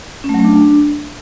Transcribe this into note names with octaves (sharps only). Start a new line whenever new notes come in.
C#4
A3
F#3
A3
D4